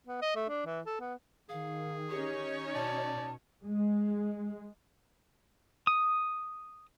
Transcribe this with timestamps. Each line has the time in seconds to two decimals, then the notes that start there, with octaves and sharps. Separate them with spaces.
0.07 B3
0.22 D#5
0.36 A3
0.49 D4
0.66 E3
0.86 A4
1.00 B3
1.49 D#3 G#4 F5
2.10 C#4 D#4 G4 C#5
2.74 B2 D5 A5
3.64 G#3
5.87 D#6